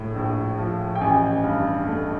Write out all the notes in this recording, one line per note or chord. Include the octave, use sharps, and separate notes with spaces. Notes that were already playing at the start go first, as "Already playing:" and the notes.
Already playing: A#1 A2
A#1
F3
G5
A1 G#5
G2
A3